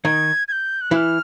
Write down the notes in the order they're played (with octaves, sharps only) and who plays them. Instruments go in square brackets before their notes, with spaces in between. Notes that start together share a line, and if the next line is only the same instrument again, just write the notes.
[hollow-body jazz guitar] D#3 D#4 [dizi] G#6
[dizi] G#6
G6
F#6
[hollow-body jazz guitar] E3 E4 [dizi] F#6
[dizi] F6